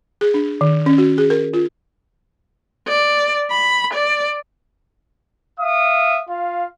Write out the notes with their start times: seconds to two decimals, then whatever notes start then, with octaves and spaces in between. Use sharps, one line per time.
0.21 G#4
0.34 D4
0.61 D#3
0.86 C#4
0.98 F#4
1.18 G#4
1.30 A#4
1.53 F4
2.88 D5
3.51 B5
3.94 D5
5.59 E5 F5 D#6
6.28 F4 F5